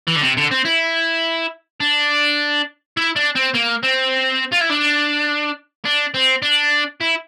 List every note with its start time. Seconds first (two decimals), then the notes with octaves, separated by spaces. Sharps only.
0.07 E3
0.15 D3
0.22 C3
0.37 D3
0.51 C4
0.65 E4
1.80 D4
2.97 E4
3.16 D4
3.35 C4
3.54 A#3
3.83 C4
4.52 F4
4.60 E4
4.69 D4
5.85 D4
6.14 C4
6.42 D4
7.01 E4